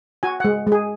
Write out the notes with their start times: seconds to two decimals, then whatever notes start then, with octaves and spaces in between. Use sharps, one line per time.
0.23 F#4 G#5
0.40 F#5
0.45 G#3
0.67 G#3 G#4